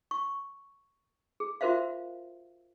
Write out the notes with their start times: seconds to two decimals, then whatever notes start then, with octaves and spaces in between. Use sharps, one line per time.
0.11 C#6
1.40 G#4
1.61 F4 F#4 A#4 C5 E5 F5